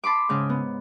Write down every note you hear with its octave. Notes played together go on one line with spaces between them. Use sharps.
A5 B5 C6 D6
G#2 C#3
B3